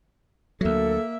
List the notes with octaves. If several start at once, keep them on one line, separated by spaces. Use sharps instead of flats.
D2 F#3 A#3 A4 E5